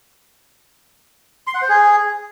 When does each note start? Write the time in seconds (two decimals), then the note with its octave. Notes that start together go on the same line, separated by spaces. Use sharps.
1.47 C6
1.54 F#5
1.62 C5
1.69 G#4